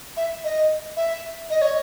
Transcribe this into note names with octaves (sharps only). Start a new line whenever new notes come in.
E5
D#5
E5
D#5
C#5